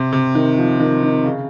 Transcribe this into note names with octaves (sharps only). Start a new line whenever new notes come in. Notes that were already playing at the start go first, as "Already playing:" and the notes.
Already playing: C3
C3
D#3
F3
D#3
D#3
C#3